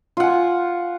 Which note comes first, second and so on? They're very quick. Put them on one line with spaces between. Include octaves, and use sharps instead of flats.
F4 F#5 G#5